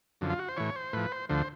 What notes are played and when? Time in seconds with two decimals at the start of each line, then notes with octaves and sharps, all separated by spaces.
0.21 F#2 D3 F3
0.30 F4
0.39 F#4
0.49 C5
0.57 A2 E3 C#5
0.76 C5
0.93 A2 F3 B4
1.12 C5
1.29 D2 D3 F3 C5